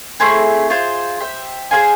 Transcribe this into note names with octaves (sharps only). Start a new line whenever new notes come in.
A3 C4 E4 G#4
F4 G#4 C5
G4 C5 E5
G#4 C5 F5 G#5